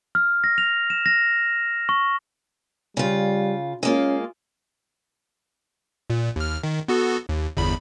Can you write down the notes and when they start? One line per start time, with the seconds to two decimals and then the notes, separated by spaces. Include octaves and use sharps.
0.15 F6
0.44 A#6
0.58 F7
0.90 E7
1.06 A#6
1.89 C#6
2.97 C#3 G3 F4
3.83 G#3 A#3 C#4 F4
6.10 A#2
6.36 D#2 F6
6.63 D#3
6.88 B3 F#4 A4
7.29 D#2
7.57 G1 E2 B5